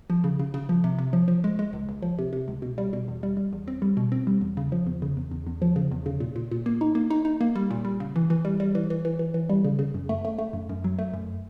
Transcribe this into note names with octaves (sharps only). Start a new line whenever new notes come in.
F3
C#3
C#3
C#3
F3
C3
C3
F3
F3
G#3
G#3
C#2
C#2
F3
C3
C3
C#2
B2
G3
B2
E2
G3
G3
E2
C4
G3
B2
C4
G3
E2
C#3
F3
E2
C#3
E2
E2
E2
F3
C#3
E2
C#3
A#2
A#2
A#2
A#3
D#4
A#3
D#4
D#4
A#3
G3
A#2
G3
C#3
E3
E3
G3
G3
E3
E3
E3
E3
E3
G3
C#3
C#3
F#2
A3
A3
A3
F#2
F#2
F#3
A3
F#2